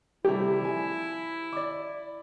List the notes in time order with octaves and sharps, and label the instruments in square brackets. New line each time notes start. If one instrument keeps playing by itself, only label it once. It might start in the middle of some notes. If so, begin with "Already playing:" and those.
[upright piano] C3 G3 A3 [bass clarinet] E4 [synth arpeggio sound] G4
[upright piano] F3 G#5
D5 D6